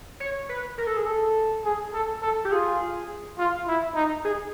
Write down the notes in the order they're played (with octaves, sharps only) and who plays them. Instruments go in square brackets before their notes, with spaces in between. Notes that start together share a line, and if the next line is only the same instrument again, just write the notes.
[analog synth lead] C#5
B4
A#4
A4
G#4
A4
[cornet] G#4
A4
A4
[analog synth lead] G4
[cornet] F4 [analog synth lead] G#4
[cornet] F4
E4
D#4
[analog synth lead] G#4